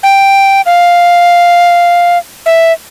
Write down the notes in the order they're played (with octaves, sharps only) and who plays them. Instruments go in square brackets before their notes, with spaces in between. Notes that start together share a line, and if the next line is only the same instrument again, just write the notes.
[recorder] G5
F5
E5